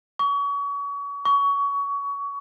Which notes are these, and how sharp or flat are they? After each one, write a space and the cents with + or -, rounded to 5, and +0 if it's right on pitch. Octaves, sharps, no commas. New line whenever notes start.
C#6 +35
C#6 +25